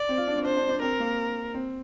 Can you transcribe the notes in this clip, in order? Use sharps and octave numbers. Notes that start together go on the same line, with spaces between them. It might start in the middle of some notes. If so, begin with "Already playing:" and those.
Already playing: D5
C4
F4
D4
C4
D4 C5
D4
D4
C4 A#4
A#3
C4